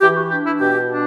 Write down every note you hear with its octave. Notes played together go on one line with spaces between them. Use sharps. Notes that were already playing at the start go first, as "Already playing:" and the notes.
E3 G4
F#4
D4 G4
E4
B2 G4
D4